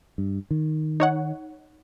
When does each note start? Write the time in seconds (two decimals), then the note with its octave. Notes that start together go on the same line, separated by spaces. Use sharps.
0.18 G2
0.51 D#3
1.00 D#4 C#5 F#5